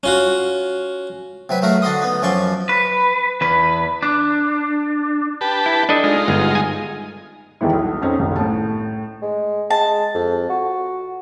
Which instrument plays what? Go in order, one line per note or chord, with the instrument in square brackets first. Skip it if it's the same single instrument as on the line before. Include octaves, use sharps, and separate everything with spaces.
[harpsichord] C#4 F4 F#4
C3 F#3 B4
F#3 A3 F#4 A#4 F5
D3 D4 F#4 D#5 C6 D#6
B3 D#4
F#2 F3 C#4 D5 C6 C#6
[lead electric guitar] B4
E2 B4
D4
[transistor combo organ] G4 B4 A5
[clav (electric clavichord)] E4
D4 A4 D#5
[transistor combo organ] G#3 D#4 F4
[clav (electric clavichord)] G1
G#5
[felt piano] E2 D#3 E3 G3 E4
B1
F2 C4 C#4 D#4
F#1 C2 D#3
A2 A5
[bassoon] G#3
[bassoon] G#3 [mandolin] A5
[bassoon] F2
F#4